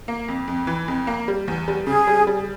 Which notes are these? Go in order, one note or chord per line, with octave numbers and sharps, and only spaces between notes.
A#3
F2
F2
E3
F2
A#3
G3
E2
G3
C#3 G#4
G3
G3